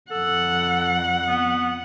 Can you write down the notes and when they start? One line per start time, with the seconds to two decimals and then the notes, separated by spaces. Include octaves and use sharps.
0.11 F2 A4 F#5
1.27 B3